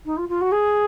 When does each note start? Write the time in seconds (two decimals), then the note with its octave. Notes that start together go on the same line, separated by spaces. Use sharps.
0.05 D#4
0.17 F4
0.28 F4
0.41 F#4
0.51 G#4